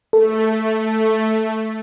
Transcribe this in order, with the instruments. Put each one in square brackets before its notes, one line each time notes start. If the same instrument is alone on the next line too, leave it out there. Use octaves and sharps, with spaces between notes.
[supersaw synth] A3 [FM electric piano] A4